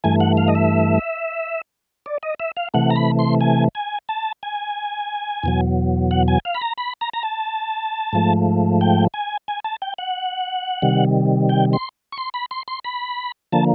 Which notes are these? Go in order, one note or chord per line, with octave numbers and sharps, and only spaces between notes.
G2 E3 A3 G#5
F#5
F5
D#5
E5
D5
D#5
E5
F5
C3 E3 A3 F#5
A#5
B5
C6
G#5
G#5
A5
G#5
E2 B2 F#3
F#5
G#5
F5
B5
A#5
B5
A#5
A#5
A5
G#2 F3 A3
G5
G#5
G#5
A5
G5
F#5
C3 D#3 G3
G5
C6
C#6
C6
B5
C6
C6
B5
D3 F3 A#3 A5